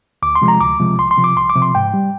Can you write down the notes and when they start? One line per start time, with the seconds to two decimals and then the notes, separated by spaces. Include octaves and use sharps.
0.22 D2 D6
0.35 C6
0.42 C3 F3 G#3
0.48 A#5
0.60 D2 D6
0.80 C3 F3 G#3
0.98 C2 C6
1.11 C6
1.18 C3 F3
1.24 D6
1.37 C2 C6
1.50 D6
1.56 C3 F3
1.62 C6
1.75 G#2 G5
1.94 G3